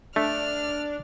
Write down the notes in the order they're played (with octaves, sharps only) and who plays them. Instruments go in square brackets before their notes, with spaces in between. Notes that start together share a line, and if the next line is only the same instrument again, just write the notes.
[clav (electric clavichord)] A3 [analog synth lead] D4 [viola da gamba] D5 [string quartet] F6